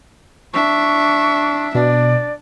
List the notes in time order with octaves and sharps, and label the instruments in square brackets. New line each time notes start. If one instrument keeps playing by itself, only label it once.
[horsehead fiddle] D4 E5 [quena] C#6
[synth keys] B2 [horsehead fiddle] D4 [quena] D5